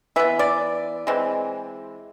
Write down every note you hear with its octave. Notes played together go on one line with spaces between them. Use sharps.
E3 B3 E5
D5
E3 G#3 C4